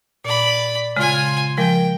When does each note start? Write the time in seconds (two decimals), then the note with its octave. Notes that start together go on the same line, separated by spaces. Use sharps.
0.25 A#2 D5 B5
0.96 C#3 G#3 F4 G#5
1.57 F3 G#3 A#4 G5